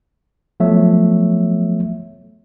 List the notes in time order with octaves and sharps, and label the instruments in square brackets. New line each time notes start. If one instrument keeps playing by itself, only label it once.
[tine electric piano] F3 F#3 A3 B3 C#5 E5